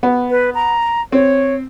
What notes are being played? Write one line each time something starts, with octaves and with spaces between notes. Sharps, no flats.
B3
B4
A#5
C4 C#5